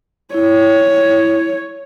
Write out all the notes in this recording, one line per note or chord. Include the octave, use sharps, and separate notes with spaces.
E4 C#5